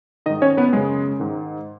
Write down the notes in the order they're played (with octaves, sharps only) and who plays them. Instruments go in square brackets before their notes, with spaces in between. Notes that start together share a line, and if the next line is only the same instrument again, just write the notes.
[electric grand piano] G#2 D#3 D#4 D#5
C#4 C#5
B3 B4
F#2 C#3 G#3 G#4
G#2 D#3